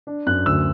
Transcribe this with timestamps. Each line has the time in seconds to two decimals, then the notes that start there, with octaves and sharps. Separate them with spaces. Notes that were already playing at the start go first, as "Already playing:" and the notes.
0.07 D4
0.26 F#2 F#6
0.46 D2 E6